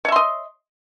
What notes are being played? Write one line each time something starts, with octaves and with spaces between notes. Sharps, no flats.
C#5 D#5 E5 C6